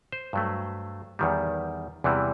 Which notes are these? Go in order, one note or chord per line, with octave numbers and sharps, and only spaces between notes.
C5
G2 F#3 A3
E2 D#3 G3
E2 C3 E3 G3